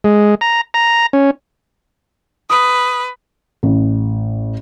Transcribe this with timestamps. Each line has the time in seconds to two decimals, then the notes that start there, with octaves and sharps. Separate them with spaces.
0.04 G#3
0.41 A#5
0.74 A#5
1.13 C#4
2.50 B4 D#6
3.63 A1